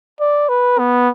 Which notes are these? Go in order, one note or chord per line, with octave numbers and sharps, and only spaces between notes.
D5
B4
B3